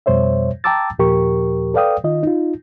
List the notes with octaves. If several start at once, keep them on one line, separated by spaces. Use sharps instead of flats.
F2 B2 G3 C5 C#5 E5
G5 A5 A#5 D6 E6 A6
D#2 A#2 F3 G4 A#4 C#6
A4 B4 D5 F5 G5 D#6
D#3 F4 D#5
D#4 F4